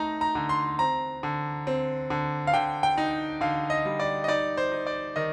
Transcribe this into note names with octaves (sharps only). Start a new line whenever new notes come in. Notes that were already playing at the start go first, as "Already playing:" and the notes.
Already playing: A3 D#4 A#5
A#5
D3
C6
C4 A#5
D3
C4
D3
F5
D3 G5
G5
D#4
D3 F5
D#5
G3
D5
D#5
D#4 D5
C5
D#4
D5
D#3 D#5